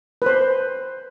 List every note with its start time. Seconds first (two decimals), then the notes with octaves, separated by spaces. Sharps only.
0.22 B4
0.26 C5